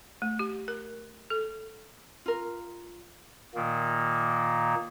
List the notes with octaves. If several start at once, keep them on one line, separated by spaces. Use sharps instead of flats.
A3
G4
A#4
A4
F4 A#4
A#2 D#3 A#3